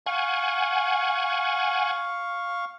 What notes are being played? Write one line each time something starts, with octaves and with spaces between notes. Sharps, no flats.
F5 F#5 G#5 C#6